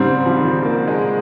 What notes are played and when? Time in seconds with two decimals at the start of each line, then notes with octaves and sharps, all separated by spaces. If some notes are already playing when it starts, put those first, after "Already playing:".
Already playing: G#2 C#3 G3 C4
0.26 F3
0.38 D#3
0.50 F3
0.63 A#3
0.87 G#3